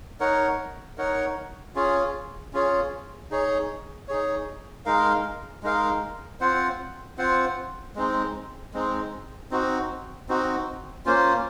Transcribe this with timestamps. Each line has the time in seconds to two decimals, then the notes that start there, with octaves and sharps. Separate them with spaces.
0.20 D#4 A#4 C#5 F#5
0.98 D#4 A#4 C#5 F#5
1.75 C#4 F4 G#4 C#5
2.53 C#4 F4 G#4 C#5
3.31 D#4 G#4 C#5
4.08 D#4 G#4 C#5
4.86 G#3 D#4 A#4 F5
5.63 G#3 D#4 A#4 F5
6.41 C4 F4 C5 F#5
7.18 C4 F4 C5 F#5
7.96 G#3 C4 D#4
8.74 G#3 C4 D#4
9.51 C4 D#4 F#4
10.29 C4 D#4 F#4
11.06 A#3 C#4 F4 C5